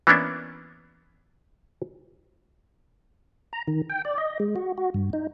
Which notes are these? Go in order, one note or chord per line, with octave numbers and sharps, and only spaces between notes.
E3 A#3 B3 C#4 D4 E4
A#5
D#3
G5
D5
D#5
G#3
F#4
F#4
G2
D#4